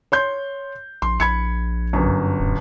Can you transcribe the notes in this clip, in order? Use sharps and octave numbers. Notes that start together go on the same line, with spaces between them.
C#5 C6 G6
A#1 C6
A#1 B5 G#6 C#7
G1 F#2
D#1